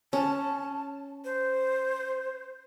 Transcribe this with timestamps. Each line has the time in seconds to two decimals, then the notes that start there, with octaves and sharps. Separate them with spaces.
0.13 C#4 A5
1.24 C5